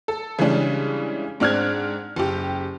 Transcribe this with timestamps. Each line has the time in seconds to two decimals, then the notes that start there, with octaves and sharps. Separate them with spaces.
0.08 A4
0.39 C#3 E3 G3 G#3 C#4 D4
1.40 G#2 C4 D4 F6 F#6 G#6
2.16 F#1 G4